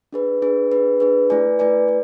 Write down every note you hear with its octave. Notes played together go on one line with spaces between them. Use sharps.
D4 G#4 B4
D4 G#4 B4
D4 G#4 B4
D4 G#4 B4
A3 E4 B4 D5 G#5
A3 E4 B4 D5 G#5
D5